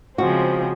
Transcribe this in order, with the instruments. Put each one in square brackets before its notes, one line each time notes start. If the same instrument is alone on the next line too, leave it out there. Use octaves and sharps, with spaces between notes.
[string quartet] C#3 F3 G#3 C4 [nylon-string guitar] F#4